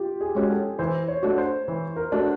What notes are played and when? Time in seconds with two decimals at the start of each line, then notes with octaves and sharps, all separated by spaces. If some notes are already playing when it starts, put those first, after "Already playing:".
Already playing: F4 G4
0.21 G#4
0.35 G#3 C#4 F#4
0.50 A4
0.79 E3 C5
1.08 C#5
1.23 A3 D4 F#4
1.38 C5
1.68 E3
1.96 A#4
2.12 A3 D4 F#4